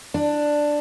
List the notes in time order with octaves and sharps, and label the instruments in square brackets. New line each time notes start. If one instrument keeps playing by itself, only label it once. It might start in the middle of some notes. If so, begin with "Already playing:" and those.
[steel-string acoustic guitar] D4